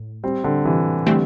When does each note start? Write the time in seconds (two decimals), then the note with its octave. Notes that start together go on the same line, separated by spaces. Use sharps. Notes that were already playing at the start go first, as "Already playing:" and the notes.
Already playing: A2
0.23 G3 C4
0.44 D3 G3
0.65 C3 E3
1.06 D3 E3 G3 A3 C4